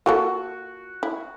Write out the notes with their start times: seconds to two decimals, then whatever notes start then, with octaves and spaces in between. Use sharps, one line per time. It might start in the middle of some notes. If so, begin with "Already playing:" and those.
0.06 A#3 F4 F#4 A4
1.03 E4